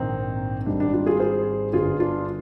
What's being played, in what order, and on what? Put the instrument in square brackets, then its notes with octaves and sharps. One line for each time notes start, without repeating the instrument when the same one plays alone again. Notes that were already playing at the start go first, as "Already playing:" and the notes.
Already playing: [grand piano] A#1 G#2 D#3 C4 D#4
G#1 G#2 G3 D4
D4
D4 F4
F4 G#4
G#4 C5
G1 G2 D3 F4 G#4
D4 F4